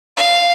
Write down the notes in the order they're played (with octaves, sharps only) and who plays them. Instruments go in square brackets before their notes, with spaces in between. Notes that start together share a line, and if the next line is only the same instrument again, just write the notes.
[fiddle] F5